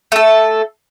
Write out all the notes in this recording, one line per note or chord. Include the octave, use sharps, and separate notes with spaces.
A3 A4